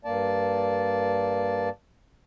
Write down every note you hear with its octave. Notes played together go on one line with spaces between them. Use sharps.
G2 A#3 D5 A5